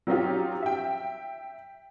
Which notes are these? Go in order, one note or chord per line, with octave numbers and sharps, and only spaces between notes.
F#3 C4 C#4 D#4 F4 G4
E5 G5